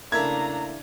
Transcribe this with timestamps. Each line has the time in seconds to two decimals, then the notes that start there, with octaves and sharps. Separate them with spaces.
0.12 C#3 A3 A#3 D4 E4 A#5 G#6